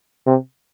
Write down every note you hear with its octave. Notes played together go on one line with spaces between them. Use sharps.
C3